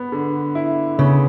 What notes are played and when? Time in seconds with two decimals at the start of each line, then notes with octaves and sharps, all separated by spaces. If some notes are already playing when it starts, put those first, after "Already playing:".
Already playing: B3
0.12 D3
0.55 E4
0.98 C#3 B3